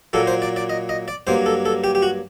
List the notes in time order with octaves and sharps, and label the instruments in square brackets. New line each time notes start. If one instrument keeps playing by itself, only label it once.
[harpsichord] A#2 F#3 A#3 A4
C5
D5
D5
D#5
D#5
D5
G2 F#3 A#3 C5
A4
A4
G4
G4
F#4